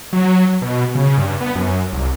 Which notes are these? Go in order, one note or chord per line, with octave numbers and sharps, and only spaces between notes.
F#3
B2
C#3
G2
B3
F#2
C2